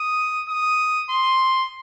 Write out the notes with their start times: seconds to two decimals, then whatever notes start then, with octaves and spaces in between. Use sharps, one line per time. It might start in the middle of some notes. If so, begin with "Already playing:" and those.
Already playing: D#6
0.49 D#6
1.10 C6